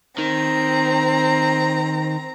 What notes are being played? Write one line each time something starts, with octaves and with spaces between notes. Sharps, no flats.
D#3 C4 A#5